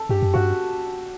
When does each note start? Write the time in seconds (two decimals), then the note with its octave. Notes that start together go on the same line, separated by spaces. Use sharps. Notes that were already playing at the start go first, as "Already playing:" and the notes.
Already playing: A4
0.09 G2 G4
0.23 F#2
0.34 G2 F#4